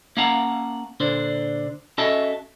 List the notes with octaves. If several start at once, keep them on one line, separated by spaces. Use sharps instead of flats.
A#3 C#4 F5 F#5 A5 A#5
A#2 D3 D4 C5
C#4 F#4 A4 D#5 E5 A5